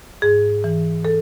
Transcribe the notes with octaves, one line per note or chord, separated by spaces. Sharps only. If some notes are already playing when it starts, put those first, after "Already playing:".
G#2 G#4
E3
A4